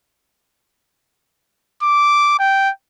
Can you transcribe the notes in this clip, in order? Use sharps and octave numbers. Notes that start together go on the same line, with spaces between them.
D6
G5